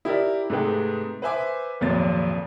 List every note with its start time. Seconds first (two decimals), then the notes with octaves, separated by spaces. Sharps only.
0.05 E4 G4 A#4 D5
0.50 G#2 C3 A3 G#4 B4 G5
1.22 B4 C5 E5 G#5 D6
1.81 G#1 F2 A#2 F#3 A6